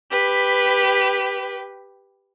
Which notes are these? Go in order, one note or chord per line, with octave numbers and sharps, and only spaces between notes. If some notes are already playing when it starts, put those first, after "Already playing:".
G4 B4